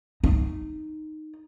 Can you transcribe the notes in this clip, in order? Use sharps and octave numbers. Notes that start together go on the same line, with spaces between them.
D#4